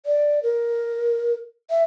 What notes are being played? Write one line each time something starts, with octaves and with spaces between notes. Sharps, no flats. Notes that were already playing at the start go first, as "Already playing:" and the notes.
D5
A#4
E5